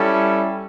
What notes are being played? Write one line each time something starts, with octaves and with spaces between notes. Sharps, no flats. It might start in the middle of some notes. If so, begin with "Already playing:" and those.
Already playing: G3 C#4 E4 A4